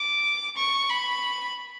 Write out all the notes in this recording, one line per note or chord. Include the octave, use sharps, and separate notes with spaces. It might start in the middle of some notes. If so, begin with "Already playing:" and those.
Already playing: D6
C#6
B5